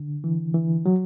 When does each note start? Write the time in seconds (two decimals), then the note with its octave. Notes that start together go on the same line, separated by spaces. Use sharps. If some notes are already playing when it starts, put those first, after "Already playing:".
Already playing: D3
0.24 E3
0.55 E3
0.86 F#3